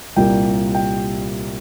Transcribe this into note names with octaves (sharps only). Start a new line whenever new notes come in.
C2 A#2 G3 A#3 G5
G5